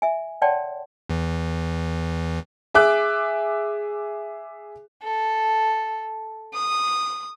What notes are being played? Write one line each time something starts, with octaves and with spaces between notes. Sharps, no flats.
E5 G#5
C#5 D5 F#5 G5 A5 C6
E2 E3
G#4 E5 D6 F#6
A4
D#6